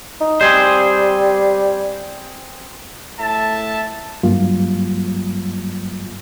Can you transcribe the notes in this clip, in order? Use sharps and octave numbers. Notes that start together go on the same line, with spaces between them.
D#4
G3 C4 G#4 C5
A2 E5 A5
G2 F#3 G3 A#3 F4